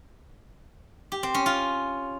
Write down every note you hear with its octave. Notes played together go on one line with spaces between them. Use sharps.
G4
C4
C#4
F4